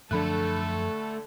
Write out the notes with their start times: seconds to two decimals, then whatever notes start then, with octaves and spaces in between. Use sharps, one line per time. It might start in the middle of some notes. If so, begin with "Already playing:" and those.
0.11 F#2 D3 F3 A3 D4 A4 B5 F#6